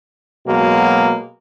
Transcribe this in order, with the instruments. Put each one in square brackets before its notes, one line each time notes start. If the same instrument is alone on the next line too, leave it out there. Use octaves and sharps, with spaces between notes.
[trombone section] B2 F#3 G#3 A#3